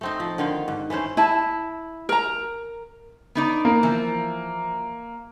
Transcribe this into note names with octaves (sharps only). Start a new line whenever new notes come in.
A3 C4 D#4
F3
D3 D#3 F5 G5
G#2
E3 A3 C#4 C5
E4 A5
A#4 A#5
B3 D#4 D5
A#3
E3 F3